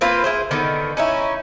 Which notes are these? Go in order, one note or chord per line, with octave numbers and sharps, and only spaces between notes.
A#3 C4 F4 B4
E4 G#4 C5
D3 D#3 B3
C#4 D#4 E4